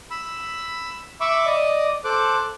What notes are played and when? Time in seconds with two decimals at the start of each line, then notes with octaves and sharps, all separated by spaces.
0.11 B5 E6
1.21 E5 B5 C#6 D6 E6
1.46 D5 D#5
2.04 A4 C5 D6 F#6